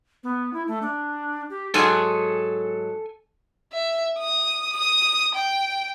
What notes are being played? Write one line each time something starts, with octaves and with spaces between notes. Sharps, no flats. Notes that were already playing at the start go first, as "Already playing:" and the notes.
B3
E4
A3
D4
G4
G#2 F#3 G#4 A4 G#5
E5
D#6
D#6
G5